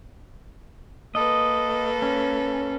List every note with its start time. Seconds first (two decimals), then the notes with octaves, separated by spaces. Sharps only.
1.15 A#3 A4 B4 D#5
2.02 C#4